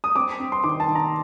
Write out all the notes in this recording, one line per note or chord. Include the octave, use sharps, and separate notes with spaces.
D#6
C4 D6
C4
C6
D#3 D6
A5
D#3
A#5